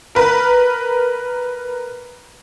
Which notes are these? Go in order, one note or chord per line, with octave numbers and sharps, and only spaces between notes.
A#4 B4